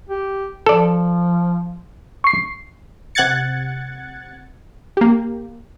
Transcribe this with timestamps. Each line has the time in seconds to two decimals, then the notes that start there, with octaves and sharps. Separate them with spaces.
0.09 G4
0.66 F3 A4 D5
2.24 C#6 C7
3.15 C3 F#5 F#6 G#6 A6 C#7
4.97 A#3 G4